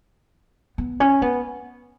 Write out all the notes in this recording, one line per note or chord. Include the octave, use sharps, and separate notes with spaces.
B3
C#4
B3